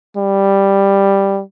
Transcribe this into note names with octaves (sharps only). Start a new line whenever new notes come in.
G3